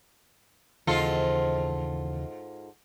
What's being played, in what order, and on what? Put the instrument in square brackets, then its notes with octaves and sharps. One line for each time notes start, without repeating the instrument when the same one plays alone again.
[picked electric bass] D#2 C#3 E3 [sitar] G#2 F4 A4